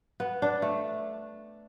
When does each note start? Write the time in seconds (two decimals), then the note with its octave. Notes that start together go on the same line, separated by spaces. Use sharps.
0.20 B3
0.42 D4
0.62 A3